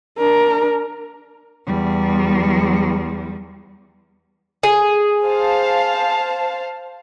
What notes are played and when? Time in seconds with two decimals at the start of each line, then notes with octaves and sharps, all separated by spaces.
0.18 D4 A#4
1.67 E2 G3
4.63 G#4
5.24 C5 F5 A5